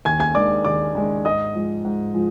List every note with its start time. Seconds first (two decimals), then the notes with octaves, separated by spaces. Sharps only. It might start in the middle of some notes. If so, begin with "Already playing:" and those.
0.05 D#2 G#5 G#6
0.20 G#5 G#6
0.35 D#3 G#3 D4 D5 D6
0.65 D#2 D5 D6
0.95 D#3 G#3 D4
1.25 G#2 D#5 D#6
1.55 F3 G#3
1.85 G#2
2.14 F3 G#3